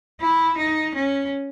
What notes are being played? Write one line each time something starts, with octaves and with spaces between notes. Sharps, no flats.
E4
D#4
C#4